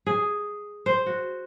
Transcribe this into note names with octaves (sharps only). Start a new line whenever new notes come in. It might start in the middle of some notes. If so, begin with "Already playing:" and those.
G#4
C5
F#4